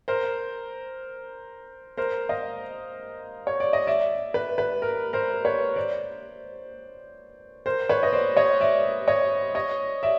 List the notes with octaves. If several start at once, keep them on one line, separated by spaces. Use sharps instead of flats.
A#4 C5
A#4 C5
D#5 F5
C#5
D5
D#5
D5 E5
B4
B4
A#4
A#4 C5
B4 C#5
C5 D5
A#4 C5
B4 C#5
D#5
C5 D5
C#5 D#5
D5 E5
C#5 D#5
C#5 D#5
D5 E5